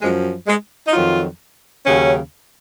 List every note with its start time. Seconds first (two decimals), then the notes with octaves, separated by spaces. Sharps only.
0.01 F#2 F3 G#3
0.47 G#3
0.87 D#4
0.93 F2 D#3 F#3 F4
1.86 D#2 C#3 F#3 C#4